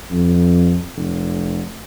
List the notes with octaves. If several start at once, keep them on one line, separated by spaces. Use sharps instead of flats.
F2
F1